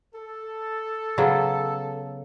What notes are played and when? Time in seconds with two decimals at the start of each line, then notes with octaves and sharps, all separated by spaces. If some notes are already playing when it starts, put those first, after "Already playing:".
0.14 A4
1.18 C#3 F#3 B3